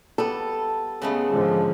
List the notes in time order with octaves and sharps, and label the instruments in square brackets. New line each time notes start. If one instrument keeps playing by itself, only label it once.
[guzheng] G3 B3 [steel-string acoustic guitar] A4
[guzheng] C#3 G#3 A3 [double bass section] B3
[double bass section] G#2 D3 F3